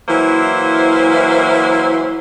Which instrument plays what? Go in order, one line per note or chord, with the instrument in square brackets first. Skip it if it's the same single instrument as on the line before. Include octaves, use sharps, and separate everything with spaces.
[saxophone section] E3 F#3 A#3 E4 C5